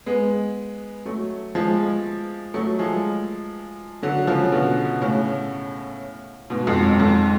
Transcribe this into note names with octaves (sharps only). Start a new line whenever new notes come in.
G#3 B3
F#3 A3
F3 G#3
F#3 A3
F3 G#3
D3 F#3
C#3 F3
B2 D3
A2 C#3
G#2 B2
F2 G#2
F#2
F2 G#2